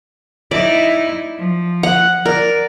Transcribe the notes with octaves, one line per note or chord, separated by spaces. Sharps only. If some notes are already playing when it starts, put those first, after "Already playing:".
D#4 E4 D5
F3
F#5
A#4 D5